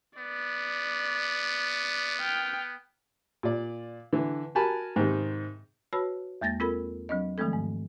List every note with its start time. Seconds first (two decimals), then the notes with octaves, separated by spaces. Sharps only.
0.18 B3 D5
2.21 G5 F6
3.43 A#2 D5
4.13 D3 E3
4.55 F#4 A#4 G#5 A5 B5
4.96 G#2 C3 D#3
5.93 F#4 B4 C#5 A5 B5 E6
6.41 E2 G#3 A#3 A6 A#6
6.60 C4 F4 A4 A#4 B5
7.09 F#3 C4 D4 D#5
7.38 D#3 F3 G#3 A3 C4 A4
7.53 G#2